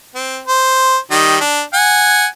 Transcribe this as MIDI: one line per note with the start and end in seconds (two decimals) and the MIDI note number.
0.15 0.39 60
0.47 0.97 72
1.11 1.38 51
1.11 1.38 55
1.11 1.38 75
1.41 1.62 62
1.74 2.26 78
1.74 2.26 80